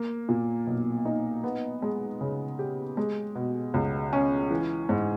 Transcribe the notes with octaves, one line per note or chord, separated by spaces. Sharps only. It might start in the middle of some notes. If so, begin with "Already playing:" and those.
Already playing: A#3
A#2
B1
D#4
B3
G#3
C#3
G4
G#3
B2
C#2
C#4
E3
G#2